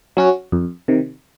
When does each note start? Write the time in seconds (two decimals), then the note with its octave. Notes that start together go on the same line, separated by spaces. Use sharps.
0.17 F#3 C#4 F#4
0.52 F2
0.88 C3 D#3